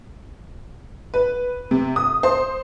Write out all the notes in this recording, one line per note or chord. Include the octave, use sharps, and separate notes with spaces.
B4
C3
D#6
C5